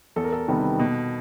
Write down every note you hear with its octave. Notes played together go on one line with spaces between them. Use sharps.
E2 A4
A#4
A4
C3 D#3 G3 B3
B2